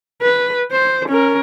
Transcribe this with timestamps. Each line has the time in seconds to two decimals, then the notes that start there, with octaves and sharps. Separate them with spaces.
0.22 B4
0.72 C5
1.09 C#4 A#4